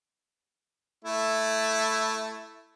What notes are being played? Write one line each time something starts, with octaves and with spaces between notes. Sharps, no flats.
A3 E4